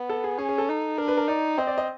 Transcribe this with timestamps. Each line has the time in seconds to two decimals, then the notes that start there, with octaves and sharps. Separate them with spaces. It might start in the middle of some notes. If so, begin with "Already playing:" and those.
Already playing: B3
0.09 A4
0.24 G#4
0.38 C#4 G#4
0.49 G#4
0.58 A4
0.69 D#4
0.98 D4 A#4
1.08 B4
1.17 A#4
1.28 D#4 D5
1.58 C4 D#5
1.67 D5
1.78 D#5